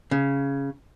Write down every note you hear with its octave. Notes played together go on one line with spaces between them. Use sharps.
C#3